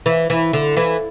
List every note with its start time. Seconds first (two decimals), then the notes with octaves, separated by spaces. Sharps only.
0.06 E3
0.30 E3
0.53 D3
0.77 E3